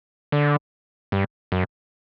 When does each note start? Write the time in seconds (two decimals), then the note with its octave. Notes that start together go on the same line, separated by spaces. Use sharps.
0.32 D3
1.12 G2
1.52 F#2